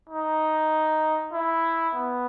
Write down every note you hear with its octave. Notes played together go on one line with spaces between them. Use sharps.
D#4
E4
B3